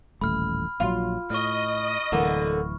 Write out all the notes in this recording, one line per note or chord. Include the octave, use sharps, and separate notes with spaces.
D#1 A1 A3 B5 F6
A#1 F#3 F4
A2 D#5 C#6 F6
D1 D3 E3 A#3